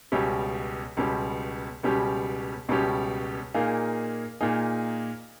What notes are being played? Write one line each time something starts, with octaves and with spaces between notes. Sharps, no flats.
C#2 B2 G3 C#4 G4
C#2 B2 G3 C#4 G4
C#2 B2 G3 C#4 G4
C#2 B2 G3 C#4 G4
A#2 A#3 D#4 G#4
A#2 A#3 D#4 G#4